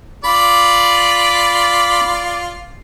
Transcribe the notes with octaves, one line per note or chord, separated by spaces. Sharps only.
F4 D5 B5